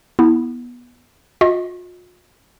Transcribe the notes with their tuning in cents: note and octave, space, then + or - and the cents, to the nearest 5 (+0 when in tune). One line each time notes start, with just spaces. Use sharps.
B3 -15 E4 -15
F4 +45 D#5 +20